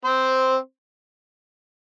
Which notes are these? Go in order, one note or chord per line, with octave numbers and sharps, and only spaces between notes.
C4 C5